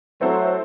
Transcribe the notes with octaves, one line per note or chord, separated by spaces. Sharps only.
F#3 A3 C4 E4 A4 C5